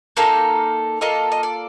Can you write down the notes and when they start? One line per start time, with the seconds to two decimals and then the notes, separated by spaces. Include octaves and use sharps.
0.17 A#3 D#4 A4 F5
1.01 A#3 F4 A4 D#5
1.32 D#5
1.43 D5